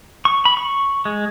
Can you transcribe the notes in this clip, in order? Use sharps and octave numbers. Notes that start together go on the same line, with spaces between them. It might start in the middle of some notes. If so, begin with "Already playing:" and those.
C#6
B5
C#6
G#3